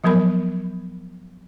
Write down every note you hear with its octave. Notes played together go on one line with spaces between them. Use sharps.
F3 F#3 B3 A#4 B5